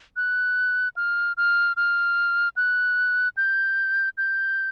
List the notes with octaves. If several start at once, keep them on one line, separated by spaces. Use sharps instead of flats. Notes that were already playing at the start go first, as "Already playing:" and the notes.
F#6
F6
F6
F6
F#6
G6
G6